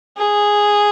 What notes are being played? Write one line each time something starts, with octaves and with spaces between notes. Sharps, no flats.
G#4